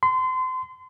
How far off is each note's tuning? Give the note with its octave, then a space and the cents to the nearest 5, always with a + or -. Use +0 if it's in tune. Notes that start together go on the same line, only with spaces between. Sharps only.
C6 -30